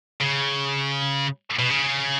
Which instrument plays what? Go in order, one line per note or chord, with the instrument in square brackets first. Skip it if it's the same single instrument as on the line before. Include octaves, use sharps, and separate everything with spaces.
[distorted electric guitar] C#3
B2
C#3